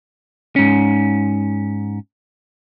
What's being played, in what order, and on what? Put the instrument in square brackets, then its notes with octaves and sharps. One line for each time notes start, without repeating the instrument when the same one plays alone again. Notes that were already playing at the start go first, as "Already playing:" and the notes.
[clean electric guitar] G#2 C#4